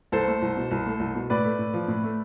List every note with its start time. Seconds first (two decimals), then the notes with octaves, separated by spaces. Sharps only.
0.12 C2 A4 C5
0.28 A3
0.42 C2
0.57 B2
0.71 C2
0.86 A3
1.00 C2
1.15 B2
1.30 A2 B4 D5
1.44 A3
1.59 A2
1.74 F3
1.88 A2
2.04 A3